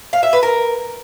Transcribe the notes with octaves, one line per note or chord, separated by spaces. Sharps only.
F5
E5
B4
A#4